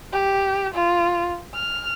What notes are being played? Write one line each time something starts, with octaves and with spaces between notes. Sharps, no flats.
G4
F4
F6